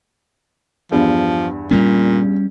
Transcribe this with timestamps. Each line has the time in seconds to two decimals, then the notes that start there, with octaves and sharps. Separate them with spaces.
0.92 E2 G2 F3
1.71 A#2 G3 A3 C#4